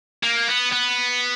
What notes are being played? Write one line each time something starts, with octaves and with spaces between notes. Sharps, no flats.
A#3
B3
B3